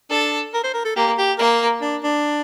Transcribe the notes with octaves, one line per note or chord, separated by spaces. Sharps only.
D4 A4
A#4
C5
A#4
A4
A#3 G4
G4
A#3 A#4
D4
D4